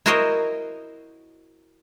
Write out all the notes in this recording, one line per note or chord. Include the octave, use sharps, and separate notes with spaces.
E4 F#4 A#4 C5 C#5 D#5